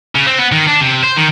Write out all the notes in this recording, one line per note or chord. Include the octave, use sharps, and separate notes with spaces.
C#3
C4
B3
D#3
D4
C3
C5
D#3